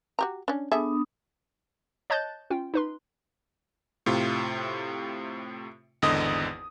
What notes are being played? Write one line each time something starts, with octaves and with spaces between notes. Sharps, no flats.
F#4 G4 A#5
C#4 D4
B3 D4 G#4 A4 E5 D#6
C#5 D#5 A5 F#6 G6 A6
C#4 F4 G5
D#4 B4 C6
A2 C3 F4
G#1 E2 D3 D#5 D#6